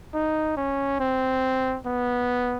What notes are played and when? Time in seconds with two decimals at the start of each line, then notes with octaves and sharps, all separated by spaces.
0.14 D#4
0.57 C#4
1.00 C4
1.86 B3